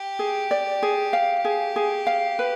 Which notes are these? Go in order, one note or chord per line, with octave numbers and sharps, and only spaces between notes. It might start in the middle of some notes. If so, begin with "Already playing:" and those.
Already playing: G4
G#4
D5
G#4
F5
G#4
G#4
F5
B4